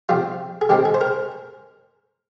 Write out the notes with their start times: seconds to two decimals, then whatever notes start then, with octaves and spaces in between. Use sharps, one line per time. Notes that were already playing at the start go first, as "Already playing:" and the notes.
0.09 C3 F3 C4 F4
0.61 G#4
0.69 D#3 G#3 C4 D#4 G4
0.85 G#4
0.94 C5
1.01 A#4